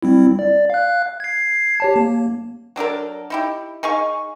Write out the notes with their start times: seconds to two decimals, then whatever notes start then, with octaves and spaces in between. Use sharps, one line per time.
0.03 G3 C4 E4
0.39 D5
0.70 F5 F#6
1.20 G#6 C7
1.80 G4 C#5 A5
1.96 A#3
2.76 F#3 D4 A4 A#4
3.30 D#4 E4 G4
3.83 D#4 G#4 F5 C#6